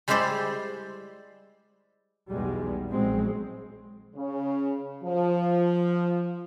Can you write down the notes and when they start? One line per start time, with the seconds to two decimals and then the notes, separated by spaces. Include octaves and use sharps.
0.08 G3 G#3 E4 G4 C5 D5
2.30 B1 E2 G3 G#3
2.90 A#1 F#3 G#3 C4
4.15 C#3
5.03 F3